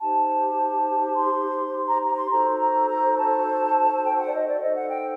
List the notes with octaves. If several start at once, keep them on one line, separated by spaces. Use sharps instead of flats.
D#4 G4 C5 A5
C6
A#5
A#5
C6
D#4 F#4 A4 C5 A#5
A#5
A#5
A5
G5
F#5
D5
D#5
D5
D#4 A4 C5 D#5
F#5
G5